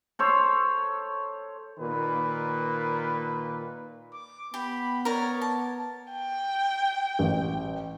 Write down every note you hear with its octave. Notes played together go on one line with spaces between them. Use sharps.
A4 C5 C#5
A#2 D#3 B4
D6
B3 G4 B5
A#4 C#5 D5
A5
G5
A1